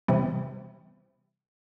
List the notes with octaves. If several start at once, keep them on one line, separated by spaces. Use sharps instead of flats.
C3 E3 G3 B3